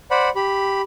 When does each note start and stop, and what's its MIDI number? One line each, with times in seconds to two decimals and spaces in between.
0.11 0.29 72
0.11 0.29 74
0.11 0.29 78
0.11 0.29 83
0.36 0.81 67
0.36 0.81 83